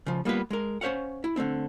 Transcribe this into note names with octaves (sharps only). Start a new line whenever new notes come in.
C#3 F3
G3 A#3 B3 F4 B4
G#3 A#4
C#4 C5 C#5 F5 F#5
E4
D3 A3 C4 E4